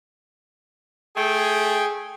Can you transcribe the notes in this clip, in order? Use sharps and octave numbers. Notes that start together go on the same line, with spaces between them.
A3 G#4 G5